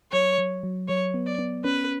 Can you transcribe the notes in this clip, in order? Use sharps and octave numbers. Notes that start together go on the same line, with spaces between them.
F#3 C#5
F#3
F#3
F#3 C#5
B3
D5
B3
C#4 B4